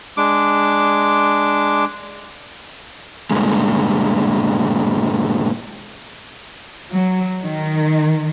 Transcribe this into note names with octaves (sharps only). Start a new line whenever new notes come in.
G#3 D4 D6
G2 A#2 D3 G#3
F#3
D#3